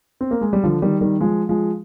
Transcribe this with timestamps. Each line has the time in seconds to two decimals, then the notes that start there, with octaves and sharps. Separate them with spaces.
0.21 C4
0.31 A#3
0.41 G#3
0.53 G3
0.64 D3 F3
0.82 D#3 G3
1.01 D#3 G3
1.21 F3 G#3
1.49 F3 G#3